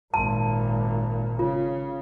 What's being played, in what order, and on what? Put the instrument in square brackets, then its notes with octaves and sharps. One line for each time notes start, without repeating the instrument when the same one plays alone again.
[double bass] G#1 A#2 [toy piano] A5 C6
[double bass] C#3 [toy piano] F4